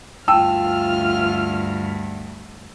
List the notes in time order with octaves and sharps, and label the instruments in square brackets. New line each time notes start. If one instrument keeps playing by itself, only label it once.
[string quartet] D2 G2 [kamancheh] F4 F6 [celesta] G5 A5 [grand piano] E6